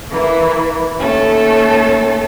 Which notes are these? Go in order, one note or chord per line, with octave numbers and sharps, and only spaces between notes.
E3 A#3 E4
D#2 A3 C#4 A4